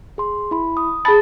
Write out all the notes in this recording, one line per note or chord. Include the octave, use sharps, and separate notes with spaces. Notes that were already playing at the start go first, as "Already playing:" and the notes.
G#4 C6
E4 B5
D#6
G#4 A5 B5 A6